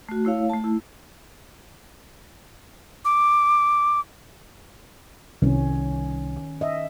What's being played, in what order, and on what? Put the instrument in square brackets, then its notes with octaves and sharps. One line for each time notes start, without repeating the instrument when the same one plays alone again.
[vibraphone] A3 F#4
A3 E4 C#5 F5
A3 A5
E4
[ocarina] D6
[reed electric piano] C2 [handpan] D#3 C#4
[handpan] D#5 E5